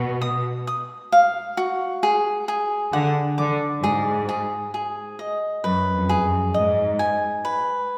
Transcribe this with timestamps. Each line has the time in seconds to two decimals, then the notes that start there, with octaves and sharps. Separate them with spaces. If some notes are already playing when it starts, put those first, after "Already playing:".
Already playing: B2 F#4
0.21 D#6
0.67 D#6
1.12 F5
1.57 F#4
2.03 G#4
2.48 G#4
2.93 D3 F#5
3.38 D3 D6
3.83 G#2 G#4
4.29 G#4
4.74 G#4
5.19 D#5
5.64 F#2 B4
5.94 F2
6.09 G#4
6.24 F#2
6.54 G#2 D#5
6.99 G#5
7.45 B4